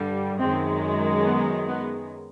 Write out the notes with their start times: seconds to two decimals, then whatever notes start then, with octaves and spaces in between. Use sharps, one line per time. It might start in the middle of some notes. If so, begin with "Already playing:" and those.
Already playing: G2 D3 G3
0.39 F#2 D#3 G#3 C4
1.25 B3
1.68 B3